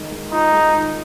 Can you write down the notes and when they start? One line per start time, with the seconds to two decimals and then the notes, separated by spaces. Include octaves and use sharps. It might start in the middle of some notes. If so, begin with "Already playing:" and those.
Already playing: D#3 G#3
0.10 G#3
0.31 D#4 F4
0.52 G#3
0.74 D#3